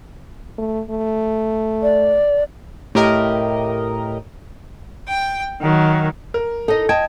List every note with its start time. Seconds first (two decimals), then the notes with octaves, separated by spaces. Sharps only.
0.58 A3
0.90 A3
1.82 D5
2.95 A2 G4 A#4 D#5
5.07 G5
5.61 D#3 F#3
6.34 A#4
6.68 D#4 A4 D#5
6.89 D#5 G5 A5 G#6